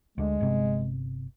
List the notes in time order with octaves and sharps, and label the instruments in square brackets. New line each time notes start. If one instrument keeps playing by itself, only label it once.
[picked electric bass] D2 D3 [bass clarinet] G#3
[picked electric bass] G1 C3 B3